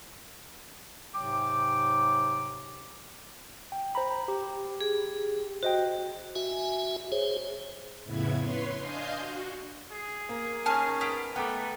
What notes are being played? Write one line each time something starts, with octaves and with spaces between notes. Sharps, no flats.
G#2 C3 F#3 G5 D6
G5
C5 A#5 B5
G4
G#4
F#4 C5 D#5 G5
F#4 E5 G#5
G#4 C5 C#5
F2 A2 C#3 B3 E4 G#6
B4 C#5 C6
D4 D#5 F5 G#5 C6 G6
F#4
G#4
A#3
D#3 C#4 G#5 A5 F6
B3 B6 D7
A3 B3 B4 G5 A#5 D6